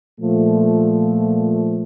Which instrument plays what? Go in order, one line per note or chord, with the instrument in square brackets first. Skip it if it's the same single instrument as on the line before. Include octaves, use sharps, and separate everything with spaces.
[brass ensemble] A#2 F3 A3